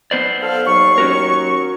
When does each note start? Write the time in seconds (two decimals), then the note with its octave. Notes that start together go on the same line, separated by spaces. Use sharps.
0.11 B3 C5 D5
0.42 A4 F5
0.66 D#2 F#3 C#6
0.98 C#4 F#4 A#4